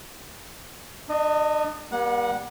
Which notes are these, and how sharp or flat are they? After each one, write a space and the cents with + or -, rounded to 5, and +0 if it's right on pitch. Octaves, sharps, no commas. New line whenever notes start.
D4 +40 D#5 -5
G3 +0 A#3 +40 F#5 -15